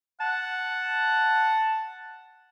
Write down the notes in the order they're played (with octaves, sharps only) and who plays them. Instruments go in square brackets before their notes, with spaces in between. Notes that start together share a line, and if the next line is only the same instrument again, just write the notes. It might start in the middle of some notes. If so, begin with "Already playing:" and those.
[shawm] F#5 [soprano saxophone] A5